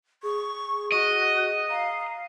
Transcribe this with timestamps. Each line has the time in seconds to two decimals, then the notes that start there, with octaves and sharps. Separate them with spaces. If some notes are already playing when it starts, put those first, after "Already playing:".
0.23 G#4 C#6
0.92 F#4 D#5
1.69 F5 A#5